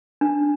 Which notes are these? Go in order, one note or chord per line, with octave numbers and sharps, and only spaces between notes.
D4